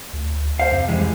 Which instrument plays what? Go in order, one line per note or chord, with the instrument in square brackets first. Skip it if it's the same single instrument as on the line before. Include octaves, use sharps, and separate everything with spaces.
[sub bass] D2
[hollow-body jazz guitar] C5 F5
[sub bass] F2 [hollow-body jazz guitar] C3
[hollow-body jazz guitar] E3 G3 G#3